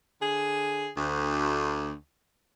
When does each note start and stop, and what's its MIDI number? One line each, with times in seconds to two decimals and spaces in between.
0.21 0.88 50
0.21 0.88 68
0.97 1.92 38